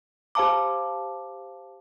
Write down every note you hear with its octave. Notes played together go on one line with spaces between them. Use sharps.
G4 C5 F5 A5 A#5 D6